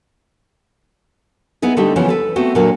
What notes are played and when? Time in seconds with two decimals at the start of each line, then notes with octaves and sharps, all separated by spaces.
1.62 B3 D#4 E4 G#4
1.77 D3 G3 A3 D#4 G4
1.96 C#3 E3 F3 B3 C#4
2.09 A4 B4
2.36 A3 B3 C4 F#4
2.55 A#2 D3 F#3 A3 A#3